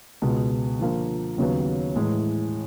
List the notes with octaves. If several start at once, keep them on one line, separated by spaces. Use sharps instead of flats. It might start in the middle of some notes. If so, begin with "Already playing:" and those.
C#2 B2 G#3 B3
D3 F3 A#3
D#2 C#3 F#3 B3
A2 E3 G#3